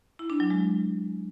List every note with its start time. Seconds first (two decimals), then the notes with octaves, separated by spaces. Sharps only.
0.19 E4
0.30 D4
0.40 F#3
0.50 G#3